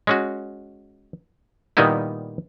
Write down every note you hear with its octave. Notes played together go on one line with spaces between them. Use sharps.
G#3 C#4 F#4
A#2 D#3 G3 B3 D#4 E4